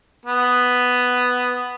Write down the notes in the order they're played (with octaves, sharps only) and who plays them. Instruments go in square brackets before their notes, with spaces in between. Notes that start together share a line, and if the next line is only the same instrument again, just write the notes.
[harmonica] B3